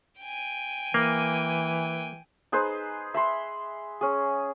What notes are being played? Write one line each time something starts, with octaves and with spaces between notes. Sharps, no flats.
G5 G#5
E3 A#3
D#4 G#4 B4 C5
E5 B5 C6
C#4 G#4